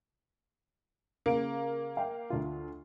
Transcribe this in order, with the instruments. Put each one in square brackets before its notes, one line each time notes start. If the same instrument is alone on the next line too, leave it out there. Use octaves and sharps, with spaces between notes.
[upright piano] C#3 A#4 D7 [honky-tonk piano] A#3
[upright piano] F5 G5
D2 F4